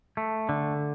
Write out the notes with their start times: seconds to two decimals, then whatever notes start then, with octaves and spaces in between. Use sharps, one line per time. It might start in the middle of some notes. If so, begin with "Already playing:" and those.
0.17 A3
0.49 D3